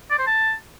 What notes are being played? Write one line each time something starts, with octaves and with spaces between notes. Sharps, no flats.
D5
C5
A5